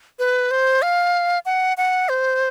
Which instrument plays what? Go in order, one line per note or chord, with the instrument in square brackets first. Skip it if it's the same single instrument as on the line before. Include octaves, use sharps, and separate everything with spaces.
[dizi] B4
C5
F5
F#5
F#5
C5